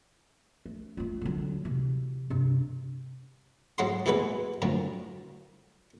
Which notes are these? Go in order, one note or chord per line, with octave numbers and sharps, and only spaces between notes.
A3
A3 F4
D3 F#3
C3 E3
G2 C3
G#2 F#3 E4 F#5 C6
D#2 B2 E3 G#3 B3 B4
F#2 A2 D3 F3